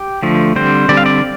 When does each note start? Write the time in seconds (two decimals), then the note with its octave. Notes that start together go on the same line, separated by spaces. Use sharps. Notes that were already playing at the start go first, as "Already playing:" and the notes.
Already playing: G4
0.23 D3 F3 A3
0.56 D3 G3 C4 C5
0.89 D3 G3 C4 D5
0.97 F5
1.06 D5